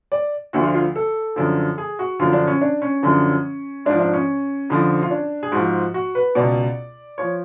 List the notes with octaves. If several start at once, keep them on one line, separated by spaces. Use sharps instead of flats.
D5
D2 D3 F3 F#4
F4
F4
A4
F#2 D3 F3
G#4
F#4
F#2 D3 F3 F4
D4
C#4
D4
C#4
F#2 D3 F3
G#2 F3 D4
D4
C#4
F2 D3 F3
F4
D4
G#4
G#2 F3 F#4
F#4
B4
C#2 B2 D5
F3 C#5